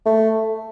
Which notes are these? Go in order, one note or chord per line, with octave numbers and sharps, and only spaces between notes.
A3